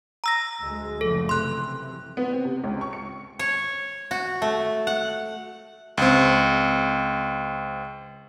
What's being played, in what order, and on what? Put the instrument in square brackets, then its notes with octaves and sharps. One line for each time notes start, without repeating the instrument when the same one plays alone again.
[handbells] A#5 E6 A#6
[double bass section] D2 G#3
[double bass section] F#1 F3 A3 [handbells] A4
[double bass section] C3 E3 [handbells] C6 F#6
[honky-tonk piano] B3
C4
C3
C#2
C#6
C#7
[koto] C#5
F#4
A3
F#5
[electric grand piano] C#2 C4